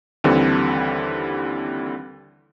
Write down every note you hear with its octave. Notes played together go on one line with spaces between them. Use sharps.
D#2 D3 E3 G3 C4